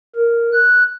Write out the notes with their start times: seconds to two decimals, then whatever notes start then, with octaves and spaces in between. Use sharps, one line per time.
0.16 A#4
0.53 F#6